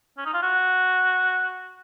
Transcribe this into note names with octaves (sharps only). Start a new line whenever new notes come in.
C#4
D#4
F4
F#4